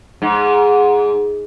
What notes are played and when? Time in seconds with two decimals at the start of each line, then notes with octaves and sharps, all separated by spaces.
0.22 G#2